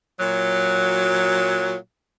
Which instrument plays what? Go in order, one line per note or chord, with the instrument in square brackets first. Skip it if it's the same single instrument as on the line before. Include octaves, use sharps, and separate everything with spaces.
[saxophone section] A#2 F#3